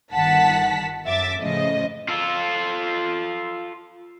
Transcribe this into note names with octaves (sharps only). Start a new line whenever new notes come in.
G1 D#3 F#5 A5 B6
F#2 E5 D6 A6
A2 C#3 F3 D#5
F4 A4